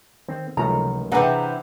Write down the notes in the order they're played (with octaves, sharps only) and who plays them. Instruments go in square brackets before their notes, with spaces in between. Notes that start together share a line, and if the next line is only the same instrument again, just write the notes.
[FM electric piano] D#3 [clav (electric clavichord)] C4
[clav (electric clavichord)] C#2 F#2 D#3 [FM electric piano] C3 F3 A3 [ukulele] A#5
[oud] C3 E3 [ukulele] D4 B4 F#5 [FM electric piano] G#4 A#5